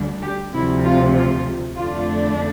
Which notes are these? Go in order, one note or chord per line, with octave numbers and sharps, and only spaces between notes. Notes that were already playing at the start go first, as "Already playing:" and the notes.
Already playing: D2 D3 G3 D4
G4
D2 C3 F3 E4
F4
F4
F2 D3 A3 D4 F4